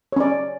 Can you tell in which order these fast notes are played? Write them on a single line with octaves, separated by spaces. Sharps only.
C#5 C#4 D5